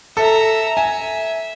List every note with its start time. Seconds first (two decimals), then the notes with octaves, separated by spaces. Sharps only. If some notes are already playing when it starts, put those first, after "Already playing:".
0.17 A4 E5 A#5
0.77 E5 G#5